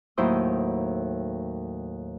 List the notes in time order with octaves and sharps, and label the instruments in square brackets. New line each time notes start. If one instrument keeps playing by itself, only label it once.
[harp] D#2 A2 F#3 E4 C5 D#6